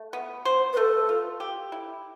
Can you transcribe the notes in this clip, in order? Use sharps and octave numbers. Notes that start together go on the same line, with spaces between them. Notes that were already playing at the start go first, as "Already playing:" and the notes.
Already playing: A3
B3
C5
B4
A3 A4
F4
G4
E4